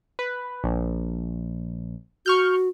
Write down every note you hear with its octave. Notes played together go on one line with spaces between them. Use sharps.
B4
A#1
F#4 C#6 F6 G6